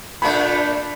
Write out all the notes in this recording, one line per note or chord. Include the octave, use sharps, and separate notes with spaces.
A#2 A3 D4 B5